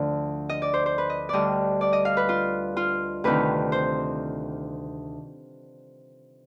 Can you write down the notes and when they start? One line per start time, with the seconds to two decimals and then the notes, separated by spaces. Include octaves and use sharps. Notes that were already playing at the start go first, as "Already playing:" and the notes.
Already playing: D2 D3 F3
0.49 D#5
0.62 D5
0.74 C5
0.86 C5
0.98 B4
1.10 D#5
1.29 D2 D3 G3 D5 D#5
1.81 D5
1.93 D#5
2.05 F5
2.17 B4
2.29 F4
2.77 F4
3.24 D2 C3 D#3 B4
3.72 C5